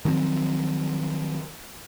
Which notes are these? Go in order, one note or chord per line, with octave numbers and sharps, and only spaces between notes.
D#3 F3 F#3 C4